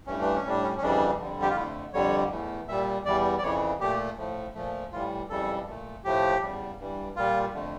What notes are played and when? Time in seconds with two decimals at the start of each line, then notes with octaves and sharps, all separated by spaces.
0.07 G2 E3 A3 C#4
0.21 D4
0.35 C#4
0.45 A2 G3 D4
0.62 C#4
0.78 C#4
0.81 F2 C#3 E3 G3 D4
1.19 F2 D3 G3
1.42 G4
1.49 F4
1.56 F2 D3 A3 E4
1.93 F2 D3 G3 C#5
2.31 E2 E3 A3
2.68 A#2 G3 E5
3.05 E2 E3 G3 D5
3.38 D5
3.43 F2 C#3 E3 C#5
3.80 A#2 A3 G4
4.17 A2 F3 A3
4.55 A#2 F3 A3
4.92 A2 E3 G3 F4
5.30 F2 C#3 E3 G3 A4
5.67 A#2 A3
6.04 A2 F3 A3 G4
6.42 E2 C#3 G3
6.79 G2 E3 G3
7.16 A#2 G3 F4
7.53 F2 D3 A3